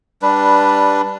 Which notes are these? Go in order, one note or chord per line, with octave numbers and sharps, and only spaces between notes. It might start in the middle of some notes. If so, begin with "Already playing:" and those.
G3 D4 B4